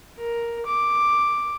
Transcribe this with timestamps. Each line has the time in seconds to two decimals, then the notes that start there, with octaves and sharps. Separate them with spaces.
0.19 A#4
0.66 D6